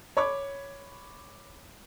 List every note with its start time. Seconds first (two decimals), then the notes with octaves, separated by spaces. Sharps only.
0.17 C#5 B5 C#6 D6